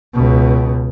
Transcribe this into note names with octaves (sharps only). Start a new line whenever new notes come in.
C#2 B2